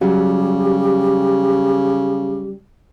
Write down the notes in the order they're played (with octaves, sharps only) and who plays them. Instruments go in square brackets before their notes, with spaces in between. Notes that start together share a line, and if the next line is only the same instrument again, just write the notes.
[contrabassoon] C#3 [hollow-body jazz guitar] F#3 G3 [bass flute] G4